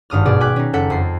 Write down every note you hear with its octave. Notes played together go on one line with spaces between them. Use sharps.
G#1 G2 D#6 F6
B2 G#4 D5
G5 G#5 D6 F#6 B6
C#4 D#4
F#1 A4 F#5 G6 B6
F2 C7